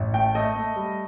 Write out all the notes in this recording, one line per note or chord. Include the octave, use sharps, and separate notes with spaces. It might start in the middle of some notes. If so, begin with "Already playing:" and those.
Already playing: A1
A3 G5
A3 D#5
A3
G3